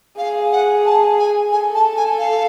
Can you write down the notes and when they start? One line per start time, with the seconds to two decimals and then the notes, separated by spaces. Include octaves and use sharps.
0.18 G#4 F5
0.52 F#5
0.86 A5
1.19 G#5
1.52 A4 G#5
1.75 A5
1.97 G#5
2.19 F5